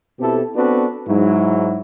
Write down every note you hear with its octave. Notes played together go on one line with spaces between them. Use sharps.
B2 C4 E4 G4 A4
B3 C4 D4 F#4 A4 B4
G#2 F#3 E4